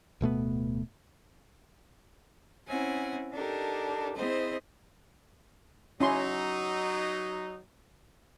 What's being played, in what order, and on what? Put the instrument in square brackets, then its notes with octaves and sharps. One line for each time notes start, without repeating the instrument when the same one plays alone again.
[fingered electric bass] D1 B2 A3 B3
[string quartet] C4 C#4 E4 F#5 G#5
D4 D#4 G4 A4 A#4
C4 E4 G#4 C5 D#5
[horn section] F#3 D#4 [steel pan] C#4 E4 C6